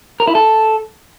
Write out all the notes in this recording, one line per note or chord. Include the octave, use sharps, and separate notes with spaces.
A#4
E4
A4